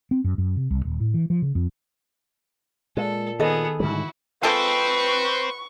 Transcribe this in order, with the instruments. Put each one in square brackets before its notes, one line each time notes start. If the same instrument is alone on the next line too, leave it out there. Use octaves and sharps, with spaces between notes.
[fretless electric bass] C4
F#2
F#2
C3
C2
D#1
A2
E3
F3
C#3
F2
[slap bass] A#2 [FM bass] G#3 [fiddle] A4
[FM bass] D#3 [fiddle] B3 G#4 [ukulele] A4 D#5
[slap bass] G#2 D3 G3 [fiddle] E4 F#4
[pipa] F3 G#3 A4 [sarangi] B4 [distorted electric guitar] C5 G5 [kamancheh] C#6